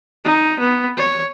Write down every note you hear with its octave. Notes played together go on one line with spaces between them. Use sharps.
D#4
B3
C#5